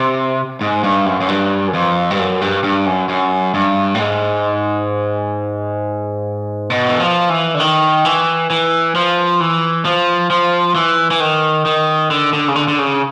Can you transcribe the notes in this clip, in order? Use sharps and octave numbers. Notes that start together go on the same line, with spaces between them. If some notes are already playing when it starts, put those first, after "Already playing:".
Already playing: C3
G#2
G2
F#2
F#2
G2
F#2
F2
G2
F#2
G2
G2
F#2
F#2
G2
A2
G#2
B2
E3
F3
E3
D3
D#3
E3
E3
F3
E3
F3
F3
E3
E3
D#3
D#3
D3
D3
C#3
D3
D3
C#3